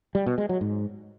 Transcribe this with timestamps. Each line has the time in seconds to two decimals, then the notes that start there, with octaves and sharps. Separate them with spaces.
0.15 G3
0.26 B2
0.38 G#3
0.49 F#3
0.61 G#2